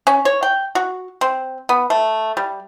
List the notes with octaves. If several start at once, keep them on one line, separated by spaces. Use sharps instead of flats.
C#4
C#5
G5
F#4
C4
B3
A3
G3